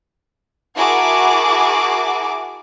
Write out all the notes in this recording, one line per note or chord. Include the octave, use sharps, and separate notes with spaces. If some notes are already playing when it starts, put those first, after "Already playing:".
E4 F#4 G#4 A#4 A5 D6